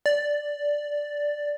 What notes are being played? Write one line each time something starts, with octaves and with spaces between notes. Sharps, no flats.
D5